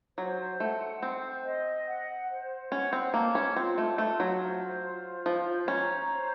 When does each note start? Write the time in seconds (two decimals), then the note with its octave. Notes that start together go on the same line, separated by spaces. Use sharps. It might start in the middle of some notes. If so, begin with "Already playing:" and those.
0.18 F#3 C5
0.60 A3 F#5
1.02 C4 C5
1.45 D#5
1.87 F#5
2.29 C5
2.72 C#4 F#5
2.93 C4
3.14 A#3 A5
3.35 C#4
3.56 C4 F4
3.78 A3
3.98 A3 F4
4.20 F#3
4.40 C5
4.83 F4
5.25 F3 C5
5.68 C#4 A#5
6.10 C5